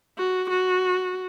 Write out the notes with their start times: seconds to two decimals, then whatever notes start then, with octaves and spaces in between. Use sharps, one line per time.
0.17 F#4
0.50 F#4